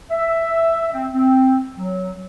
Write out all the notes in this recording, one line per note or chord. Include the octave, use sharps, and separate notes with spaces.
E5
C4
C4
F#3